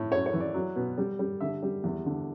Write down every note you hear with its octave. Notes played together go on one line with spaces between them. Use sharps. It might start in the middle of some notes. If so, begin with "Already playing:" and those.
Already playing: A2
F#2 C#5
C#5
E3
D5
F#3
B2
G3
G3
D3 E5
G3
E2
D3